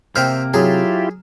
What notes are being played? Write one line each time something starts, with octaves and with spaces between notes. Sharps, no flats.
C3 A#3 C5 E5 G5 F6
F#3 E4 F4 G4 G#4